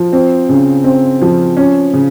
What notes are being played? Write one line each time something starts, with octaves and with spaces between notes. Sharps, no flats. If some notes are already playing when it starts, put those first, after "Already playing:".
Already playing: F3
C4
C#3
C4
F3
C#4
C#3